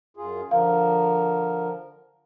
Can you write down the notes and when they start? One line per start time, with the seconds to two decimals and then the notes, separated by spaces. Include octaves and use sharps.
0.17 F#2 F4 G#4
0.51 D3 F3 A#4 F5